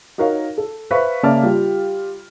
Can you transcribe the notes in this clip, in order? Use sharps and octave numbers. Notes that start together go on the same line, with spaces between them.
D#4 F#4 A#4 C#5 F5
A4
B4 C5 E5 F5 C#6 B6
C#3 A#3 D5 E5 A5 F6
G3 F4 G5